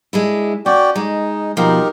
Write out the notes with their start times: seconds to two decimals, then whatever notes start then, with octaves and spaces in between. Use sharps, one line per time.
0.13 G#3 D4 E4
0.66 C#4 F#4 D5 G5
0.96 G#3 D#4
1.57 B2 F3 D#4 G4 A#4